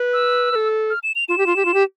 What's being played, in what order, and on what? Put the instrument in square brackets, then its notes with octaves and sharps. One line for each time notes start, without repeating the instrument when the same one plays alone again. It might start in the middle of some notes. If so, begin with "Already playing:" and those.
Already playing: [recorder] B4
[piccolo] E6
[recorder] B4
A4
[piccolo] F6
E7
F7
[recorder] F4 [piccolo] E7
[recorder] G4
F4
G4
F4
G4